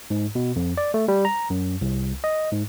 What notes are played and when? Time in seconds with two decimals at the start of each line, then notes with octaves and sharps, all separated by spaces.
0.10 G#2
0.35 B2
0.56 F2
0.78 D5
0.94 A3
1.08 G3
1.25 A#5
1.50 F#2
1.81 C2
2.24 D#5
2.52 G#2